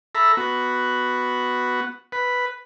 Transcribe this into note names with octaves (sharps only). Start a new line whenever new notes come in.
A4 E5 A#5 B5
B3 F#4
B4